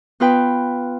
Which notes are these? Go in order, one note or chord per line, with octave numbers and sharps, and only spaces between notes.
B3 F4 B4 G5